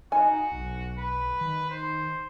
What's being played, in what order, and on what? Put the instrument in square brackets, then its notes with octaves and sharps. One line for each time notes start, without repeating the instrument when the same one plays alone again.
[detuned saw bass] D#4 [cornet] F#4 [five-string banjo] G#5
[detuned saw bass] B1
[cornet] B4
[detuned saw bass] D#3
[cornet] C5